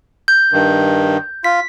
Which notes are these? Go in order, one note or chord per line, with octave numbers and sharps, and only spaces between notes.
G6
G2 D#3
F4 B6